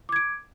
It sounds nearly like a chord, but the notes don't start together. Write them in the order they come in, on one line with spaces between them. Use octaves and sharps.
D6 G#6 D7